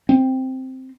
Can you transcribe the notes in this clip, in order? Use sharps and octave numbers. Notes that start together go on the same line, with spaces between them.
C4